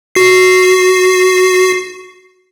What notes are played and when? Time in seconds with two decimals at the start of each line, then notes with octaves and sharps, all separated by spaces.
0.15 F#4 C7